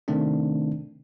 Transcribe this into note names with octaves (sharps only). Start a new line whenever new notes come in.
C3 D#3 A3 C4 D4